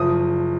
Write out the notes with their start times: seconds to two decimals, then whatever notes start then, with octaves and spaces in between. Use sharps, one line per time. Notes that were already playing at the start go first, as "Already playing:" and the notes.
Already playing: F#1 F3 D#6